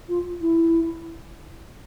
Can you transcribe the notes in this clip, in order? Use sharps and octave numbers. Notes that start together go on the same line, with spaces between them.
F4
E4